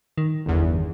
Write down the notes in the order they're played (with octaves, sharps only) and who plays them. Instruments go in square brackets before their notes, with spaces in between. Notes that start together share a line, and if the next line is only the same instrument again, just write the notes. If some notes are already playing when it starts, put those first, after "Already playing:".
[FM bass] D#3
[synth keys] G1 E2